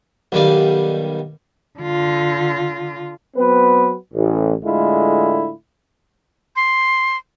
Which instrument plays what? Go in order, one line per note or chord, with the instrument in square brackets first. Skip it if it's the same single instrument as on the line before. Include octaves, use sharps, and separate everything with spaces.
[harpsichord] B1 D#3 G3 F5
[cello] D3 F4
[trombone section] F#3 B3 C4 B4
A1
A2 D3 G#3 E4 F4
[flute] C6